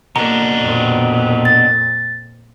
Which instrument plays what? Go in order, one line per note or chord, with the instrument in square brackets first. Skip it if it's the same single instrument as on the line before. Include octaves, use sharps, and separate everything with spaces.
[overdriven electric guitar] B2 D4 [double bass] A#3 [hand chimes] A#5
[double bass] F2 A#2
[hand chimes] A6